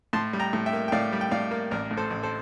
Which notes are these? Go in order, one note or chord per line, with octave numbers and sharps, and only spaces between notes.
A2 A5 C6
G3
G5 A#5
A2
E5 G5
A#3
G5
A2 D5 F5
G3
G5
A2 D5 F5
A#3
A1 A#4 D5
A2
A4 C5
A1
A4 C5